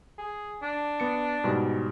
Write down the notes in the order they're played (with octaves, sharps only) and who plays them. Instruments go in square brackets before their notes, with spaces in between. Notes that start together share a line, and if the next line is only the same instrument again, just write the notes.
[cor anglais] G#4
D4
[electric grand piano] B3 C#7
G#2 B2 G3